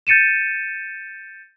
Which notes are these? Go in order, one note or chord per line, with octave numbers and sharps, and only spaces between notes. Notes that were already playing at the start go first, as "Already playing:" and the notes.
G6 A6 C#7 D#7 E7